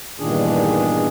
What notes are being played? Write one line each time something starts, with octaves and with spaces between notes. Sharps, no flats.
E2 G2 A#2 D#3 D4 G#4